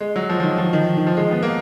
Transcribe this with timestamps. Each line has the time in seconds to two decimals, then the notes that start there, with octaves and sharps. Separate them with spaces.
0.01 G#3
0.16 F#3
0.29 F3
0.40 F3
0.43 D#3
0.58 F3
0.73 D#3
0.97 D#3
1.07 F3
1.17 G#3
1.31 B3
1.43 A#3